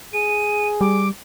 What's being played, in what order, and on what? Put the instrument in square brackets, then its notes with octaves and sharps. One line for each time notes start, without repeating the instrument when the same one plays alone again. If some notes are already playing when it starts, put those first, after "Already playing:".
[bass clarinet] G#4 [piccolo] D#7
[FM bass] G3 [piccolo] D6